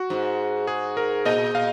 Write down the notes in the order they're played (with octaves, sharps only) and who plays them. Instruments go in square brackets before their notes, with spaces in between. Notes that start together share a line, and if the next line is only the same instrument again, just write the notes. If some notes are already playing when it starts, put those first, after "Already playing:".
Already playing: [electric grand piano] F#4
[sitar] G#2
[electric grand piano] G#4
A#4
[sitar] A#2 [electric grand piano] D#5
[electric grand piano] F5